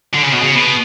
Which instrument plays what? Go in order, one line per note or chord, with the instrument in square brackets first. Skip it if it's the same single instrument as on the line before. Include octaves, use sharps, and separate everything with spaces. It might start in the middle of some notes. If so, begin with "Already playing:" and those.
[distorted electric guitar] D3
C#3
B2
C#3
B2